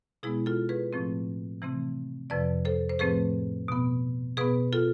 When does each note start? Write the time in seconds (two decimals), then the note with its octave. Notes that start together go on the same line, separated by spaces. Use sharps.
0.23 B2 G#3 B3 E4 G#4
0.46 F4 A4
0.69 G#4 B4
0.93 A2 F3 A3 C4
1.62 C3 E3 A3 C4
2.30 F2 C3 F3 B4 D5
2.65 A4 C5
2.89 C5
2.99 A2 F3 A3 C4 G#4 B4
3.68 B2 B3
4.37 B2 B3 G#4 B4
4.73 F4 A4